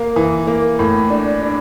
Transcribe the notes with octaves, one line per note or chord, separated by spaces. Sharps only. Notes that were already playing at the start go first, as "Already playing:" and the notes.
Already playing: A#3
E3
A#3
A2
D4
D4